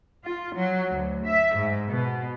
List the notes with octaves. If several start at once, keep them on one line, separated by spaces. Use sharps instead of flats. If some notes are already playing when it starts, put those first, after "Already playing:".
F4
F#3
D2
E5
G#2
B2